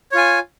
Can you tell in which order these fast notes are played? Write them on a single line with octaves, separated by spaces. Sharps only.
C#5 F4 G#5